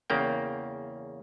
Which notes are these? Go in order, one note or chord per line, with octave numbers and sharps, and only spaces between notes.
E2 C#3 A#3 G5